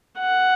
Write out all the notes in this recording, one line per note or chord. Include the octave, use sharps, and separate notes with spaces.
F#5